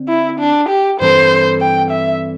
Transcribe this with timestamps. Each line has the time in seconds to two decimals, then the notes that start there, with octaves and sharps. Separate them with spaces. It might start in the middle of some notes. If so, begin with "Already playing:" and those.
Already playing: D3 C4
0.08 E4
0.39 D4
0.69 G4
1.00 G2 E3 C4 A4 C5
1.61 G5
1.91 E5